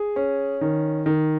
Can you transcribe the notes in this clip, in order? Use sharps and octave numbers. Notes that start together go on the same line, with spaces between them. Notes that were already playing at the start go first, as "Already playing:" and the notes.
Already playing: G#4
C#4
D#3
D#3